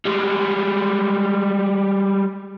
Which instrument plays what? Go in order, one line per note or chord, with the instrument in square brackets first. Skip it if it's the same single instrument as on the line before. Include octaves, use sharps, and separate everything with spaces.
[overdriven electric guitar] G3 G#3